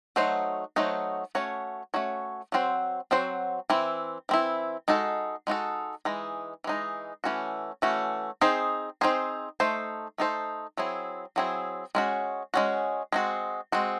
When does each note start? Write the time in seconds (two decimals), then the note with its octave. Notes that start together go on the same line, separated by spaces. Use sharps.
0.16 F#3 A3 D#4 F#4 C5
0.76 F#3 A3 D#4 F#4 C5
1.35 A3 C#4 F#4 C#5
1.94 A3 C#4 F#4 C#5
2.52 F#3 C4 F#4 C5
3.11 F#3 C4 F#4 C5
3.70 E3 C4 E4
4.29 E3 C4 E4
4.88 G#3 D#4 F#4 A4
5.47 G#3 D#4 F#4 A4
6.05 E3 G#3 D#4
6.64 E3 G#3 D#4
7.24 E3 A3 C#4 F#4
7.82 E3 A3 C#4 F#4
8.41 C4 D#4 G#4 C5
9.01 C4 D#4 G#4 C5
9.60 A3 D#4 A4 C5
10.18 A3 D#4 A4 C5
10.77 F#3 C4 E4 G#4
11.36 F#3 C4 E4 G#4
11.95 G#3 C#4 F#4
12.54 G#3 C#4 F#4
13.12 G#3 C4 F#4
13.72 G#3 C4 F#4